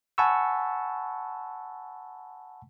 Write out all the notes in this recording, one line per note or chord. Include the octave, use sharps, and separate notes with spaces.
F#5 G#5 A5 B5 C#6 E6